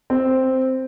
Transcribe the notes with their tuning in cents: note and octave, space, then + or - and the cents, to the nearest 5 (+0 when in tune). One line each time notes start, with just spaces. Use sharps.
C4 +0